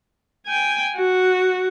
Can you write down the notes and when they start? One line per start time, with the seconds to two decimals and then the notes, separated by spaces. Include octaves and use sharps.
0.47 G5 G#5
0.96 F#4